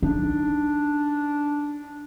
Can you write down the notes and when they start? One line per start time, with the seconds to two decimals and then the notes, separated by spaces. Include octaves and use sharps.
0.02 D4 D#4